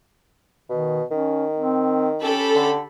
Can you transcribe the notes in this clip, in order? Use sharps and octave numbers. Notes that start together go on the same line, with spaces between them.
B2 D#3
D#3 C#4
C4
C#4 G4 A4 B5
D3